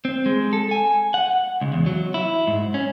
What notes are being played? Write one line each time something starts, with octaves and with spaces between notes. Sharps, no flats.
C4
G#3
A4
G#5
F#5
C#2
E2
F#3
E4
G#2
C#4